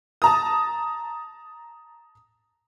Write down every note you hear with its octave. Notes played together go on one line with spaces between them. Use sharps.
A5 A#5 D#6